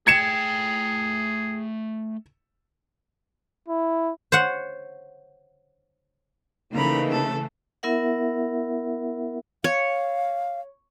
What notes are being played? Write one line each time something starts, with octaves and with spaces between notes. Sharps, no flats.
A3 G#4 G5 G#6 C#7 E7
E4
C5 C#5 F#5
C#3 E3 A3 A#3 D#4 A#5 B5
A4
B3 E4 A#4 E5 F#5
C#5 F5